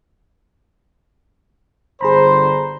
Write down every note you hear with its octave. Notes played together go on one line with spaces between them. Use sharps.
G1 D3 G#4 C5 A#5 B5